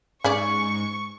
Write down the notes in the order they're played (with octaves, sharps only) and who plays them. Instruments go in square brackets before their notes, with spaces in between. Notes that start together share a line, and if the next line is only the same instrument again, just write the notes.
[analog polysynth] G#2 [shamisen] C#4 G#4 D5 [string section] C#6